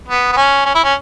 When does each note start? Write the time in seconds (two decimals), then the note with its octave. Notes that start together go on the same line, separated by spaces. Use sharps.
0.08 B3
0.32 B3
0.37 C#4
0.66 C#4
0.75 E4
0.84 C#4